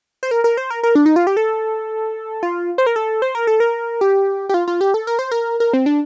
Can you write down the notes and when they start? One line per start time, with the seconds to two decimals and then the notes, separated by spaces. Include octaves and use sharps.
0.23 C5
0.31 A#4
0.44 A#4
0.57 C5
0.70 A#4
0.83 A#4
0.95 D4
1.06 D#4
1.16 F4
1.27 G4
1.37 A4
2.43 F4
2.78 C5
2.86 A#4
2.96 A4
3.22 C5
3.35 A#4
3.47 A4
3.60 A#4
4.01 G4
4.49 G4
4.54 F4
4.68 F4
4.81 G4
4.94 A4
5.07 A#4
5.19 C5
5.31 A#4
5.60 A#4
5.73 C4
5.86 D4